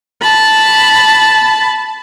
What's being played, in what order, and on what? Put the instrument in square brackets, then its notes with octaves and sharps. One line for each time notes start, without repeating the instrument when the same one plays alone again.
[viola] A5 B5